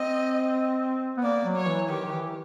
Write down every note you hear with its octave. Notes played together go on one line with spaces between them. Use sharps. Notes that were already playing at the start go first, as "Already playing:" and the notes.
Already playing: C4 D#5
B3
A#3 D5
F#3
C#5
E3
D#3 G4
D#3
E3